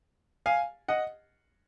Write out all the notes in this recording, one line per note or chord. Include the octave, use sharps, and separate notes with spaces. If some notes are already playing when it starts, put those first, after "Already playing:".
F5 G#5
D#5 F#5